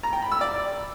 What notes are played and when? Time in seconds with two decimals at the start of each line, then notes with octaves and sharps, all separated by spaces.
0.03 A#5
0.13 G5
0.22 B5
0.32 E6
0.41 D5